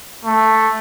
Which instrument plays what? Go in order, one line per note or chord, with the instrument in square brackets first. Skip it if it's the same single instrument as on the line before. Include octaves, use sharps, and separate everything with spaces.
[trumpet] A3